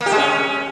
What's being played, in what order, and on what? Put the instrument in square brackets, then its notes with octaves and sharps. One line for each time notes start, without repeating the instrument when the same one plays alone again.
[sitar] A#3
G4
G#3
C#4